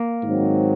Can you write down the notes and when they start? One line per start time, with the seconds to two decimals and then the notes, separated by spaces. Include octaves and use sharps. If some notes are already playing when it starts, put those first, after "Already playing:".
Already playing: A#3
0.23 G#2 D#3 F#3 C4